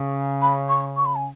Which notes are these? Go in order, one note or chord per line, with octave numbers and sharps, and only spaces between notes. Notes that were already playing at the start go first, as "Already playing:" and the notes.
Already playing: C#3
B5
C#6
C#6
B5
G#5